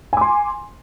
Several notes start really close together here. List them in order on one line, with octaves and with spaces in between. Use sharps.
G#5 D6 C6